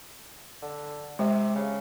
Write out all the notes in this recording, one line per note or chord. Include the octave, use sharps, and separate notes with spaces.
D3
C3 G#3
C#3